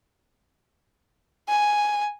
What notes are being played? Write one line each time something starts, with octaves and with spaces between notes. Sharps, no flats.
G#5